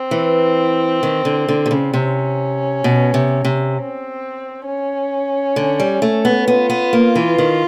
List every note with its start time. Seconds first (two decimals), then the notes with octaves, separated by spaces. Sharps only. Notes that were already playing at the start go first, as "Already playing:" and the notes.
Already playing: C4
0.11 E3
1.03 D#3
1.25 D3
1.48 D3
1.66 C3
1.71 C#3
1.94 C3 C#4
2.84 B2
3.14 C3
3.45 C3
3.74 C4
4.65 C#4
5.56 D3
5.80 G3
6.02 A3
6.25 B3
6.48 B3 F4
6.70 B3
6.93 A#3
7.16 E3
7.38 D#3